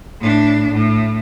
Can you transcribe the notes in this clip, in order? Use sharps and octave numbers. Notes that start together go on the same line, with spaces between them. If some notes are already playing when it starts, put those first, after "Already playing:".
A2 D4
A2